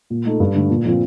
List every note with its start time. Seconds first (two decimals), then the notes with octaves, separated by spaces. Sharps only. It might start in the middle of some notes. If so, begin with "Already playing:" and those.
0.10 A#2
0.25 A3 D#4 A4
0.40 G2
0.55 D3 A3
0.70 A#2
0.85 F3 C4 F4